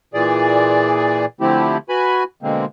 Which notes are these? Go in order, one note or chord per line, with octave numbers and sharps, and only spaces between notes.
A#2 E3 G#4 D5
D3 F3 A3 C4 E4 G4
F#4 B4 G#5 B5
B2 D3 G#3 A#3 C4